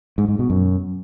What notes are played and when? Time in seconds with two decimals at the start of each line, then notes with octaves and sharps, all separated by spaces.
0.18 G#2
0.28 G#2
0.39 B2
0.50 F#2